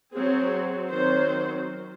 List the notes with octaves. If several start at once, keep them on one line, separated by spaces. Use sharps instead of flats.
F#3 C4 G#4
D#3 F#3 C4 C5